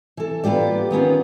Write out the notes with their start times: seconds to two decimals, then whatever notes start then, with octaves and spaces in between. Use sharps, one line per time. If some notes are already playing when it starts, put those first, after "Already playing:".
0.17 E3 A4
0.44 A#3 B3 F4 G4 D5
0.91 D#3 B3 C#4 F4